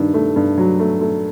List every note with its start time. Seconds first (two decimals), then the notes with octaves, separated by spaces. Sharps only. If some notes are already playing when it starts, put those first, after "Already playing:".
Already playing: G2 D#3
0.14 A3
0.36 G2
0.58 F#3
0.79 A3
1.01 A3